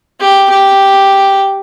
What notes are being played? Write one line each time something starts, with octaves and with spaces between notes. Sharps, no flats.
G4
G4